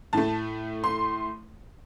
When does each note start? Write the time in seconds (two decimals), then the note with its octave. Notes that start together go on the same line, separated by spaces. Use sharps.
0.13 A2 A3 A5
0.84 C6